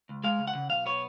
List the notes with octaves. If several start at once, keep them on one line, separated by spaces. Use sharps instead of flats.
C#2
G#3 F5
C#2
F#5
C#3
B1 F5
B3 C#5